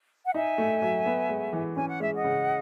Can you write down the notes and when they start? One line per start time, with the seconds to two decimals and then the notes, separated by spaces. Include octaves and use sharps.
0.25 F#5
0.34 D#4 E5 G#5
0.58 A3
0.82 F#3
1.06 B3
1.29 G#3
1.53 E3
1.77 C#4 G#5
1.89 F#5
2.00 G#3 E5
2.14 D#5 F#5
2.24 C#3